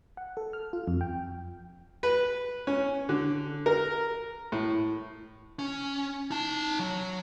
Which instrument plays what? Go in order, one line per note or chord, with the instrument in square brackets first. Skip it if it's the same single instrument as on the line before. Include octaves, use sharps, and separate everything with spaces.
[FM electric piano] F#5
A4
F6
F4
F2
G5
[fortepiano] B4
C#4
D3
A#4
A2
[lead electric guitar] C#4
D#4 A5
F#3